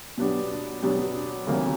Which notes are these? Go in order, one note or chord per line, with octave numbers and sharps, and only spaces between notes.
B2 F#3 B3 D4 G4
B2 F#3 B3 D4 G4
D2 C3 D#3 F#3 A#3